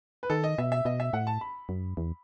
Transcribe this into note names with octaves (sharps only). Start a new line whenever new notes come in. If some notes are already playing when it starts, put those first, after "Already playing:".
B4
D#3 A4
D#5
B2 E5
E5
B2 D#5
E5
A2 F#5
A5
B5
F#2
E2